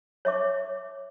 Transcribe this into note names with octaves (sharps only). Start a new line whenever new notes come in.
C#5 E5 D6